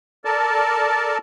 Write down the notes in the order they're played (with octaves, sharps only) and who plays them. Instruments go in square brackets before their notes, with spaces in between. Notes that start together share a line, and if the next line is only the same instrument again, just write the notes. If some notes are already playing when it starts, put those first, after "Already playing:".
[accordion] A4 A#4 D5 A5